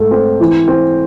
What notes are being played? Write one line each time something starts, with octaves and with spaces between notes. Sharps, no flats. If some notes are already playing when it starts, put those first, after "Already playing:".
Already playing: G#2 A3
C4
E3
C4